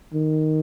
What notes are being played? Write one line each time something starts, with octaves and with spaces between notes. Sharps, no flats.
D#3